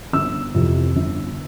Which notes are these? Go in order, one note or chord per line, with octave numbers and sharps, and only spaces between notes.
G1 E6
F2 C3 E3
G1